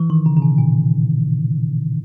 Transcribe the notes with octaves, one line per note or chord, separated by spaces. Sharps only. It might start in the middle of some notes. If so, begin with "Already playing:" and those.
Already playing: E3
D#3
C#3
C#3
B2
A#2